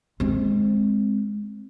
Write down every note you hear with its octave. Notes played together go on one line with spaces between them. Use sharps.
G#3 C4